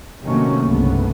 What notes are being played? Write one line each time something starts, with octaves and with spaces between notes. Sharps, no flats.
C3 D#3 F#3 A3 A#3 C#4
G1 C2 C#3 A3 B3